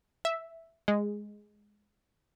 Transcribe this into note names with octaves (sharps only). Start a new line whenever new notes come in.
E5
G#3